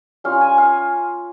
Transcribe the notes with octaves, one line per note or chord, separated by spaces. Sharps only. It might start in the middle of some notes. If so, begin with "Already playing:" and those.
G3 C#4 F4 F5
G#5
F5